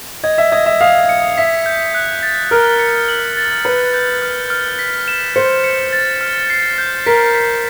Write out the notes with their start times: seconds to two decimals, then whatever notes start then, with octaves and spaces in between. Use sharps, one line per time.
0.24 D#5 G#6
0.38 E5
0.52 D#5 G#6
0.66 E5
0.81 F5 D#6
1.09 C#7
1.38 E5 B6
1.66 G6
1.94 F#6
2.23 A6
2.51 A#4 F6
2.79 C#7
3.08 F#7
3.37 A6
3.65 B4 C#7
3.94 G6
4.22 F6
4.50 F6
4.79 B6
5.08 E7
5.36 C5 C#7
5.64 C#7
5.93 A6
6.21 F6
6.50 C7
6.78 G6
7.06 A#4 B6
7.34 B6